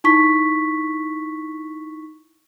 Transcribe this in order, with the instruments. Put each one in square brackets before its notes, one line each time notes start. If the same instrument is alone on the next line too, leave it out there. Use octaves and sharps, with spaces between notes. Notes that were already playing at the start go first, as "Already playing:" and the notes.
[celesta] D#4 E4 C#6 B6